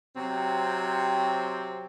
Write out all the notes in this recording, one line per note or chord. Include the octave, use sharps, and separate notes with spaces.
C3 F#3 C4